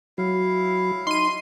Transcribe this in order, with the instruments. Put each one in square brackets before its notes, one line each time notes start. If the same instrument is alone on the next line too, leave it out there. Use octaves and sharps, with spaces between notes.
[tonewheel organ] F#3 [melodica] E4 F5
[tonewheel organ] D#4 [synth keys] C6 D#7